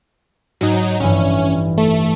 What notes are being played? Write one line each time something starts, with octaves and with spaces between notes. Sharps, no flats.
G#2 F#3 D#4
A1 G2 E3 C#4
A3